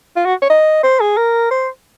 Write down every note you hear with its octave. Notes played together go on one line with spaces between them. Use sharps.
F4
F#4
C#5
D#5
C5
G#4
A#4
C5